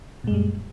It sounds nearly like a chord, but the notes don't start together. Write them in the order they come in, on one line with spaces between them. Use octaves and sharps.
A#2 G#3 F#2 G3